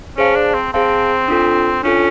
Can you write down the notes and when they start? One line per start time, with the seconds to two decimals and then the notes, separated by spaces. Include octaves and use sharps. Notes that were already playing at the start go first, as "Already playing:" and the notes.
0.18 C#4 G#4 C5 F5 A5
0.36 D4
0.54 C4
0.73 C4 G#4 C5 F5 A5
1.28 D4 F4 A4
1.83 C#4 D4 F4 A4